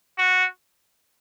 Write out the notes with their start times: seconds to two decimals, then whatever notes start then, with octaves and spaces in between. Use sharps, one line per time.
0.18 F#4